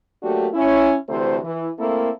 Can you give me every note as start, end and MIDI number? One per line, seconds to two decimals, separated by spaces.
0.23 0.48 54
0.23 0.48 57
0.23 0.48 58
0.23 0.48 62
0.23 0.48 66
0.23 0.48 67
0.54 0.96 61
0.54 0.96 64
1.09 1.37 38
1.09 1.37 48
1.09 1.37 52
1.09 1.37 57
1.09 1.37 72
1.43 1.69 52
1.79 2.10 57
1.79 2.10 58
1.79 2.10 60
1.79 2.10 64
1.79 2.10 69
1.79 2.10 70